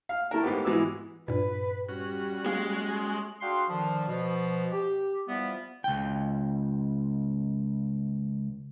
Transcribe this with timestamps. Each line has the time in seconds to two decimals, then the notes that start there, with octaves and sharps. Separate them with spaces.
0.09 F5
0.31 A3 E4 A#4
0.43 G#2 A#3 B3 G4
0.65 E3 G#3 B3 F#4 D6 E6
1.28 G2 A#2 B4
1.89 G3 C#4 F#4
2.46 G#3 A#3
3.41 D4 F#4 G#4 F5 G5 C6
3.69 D3 D#3 F3
4.07 B2 F3
4.73 G4
5.28 E3 F3 G3 B3
5.84 C#2 G5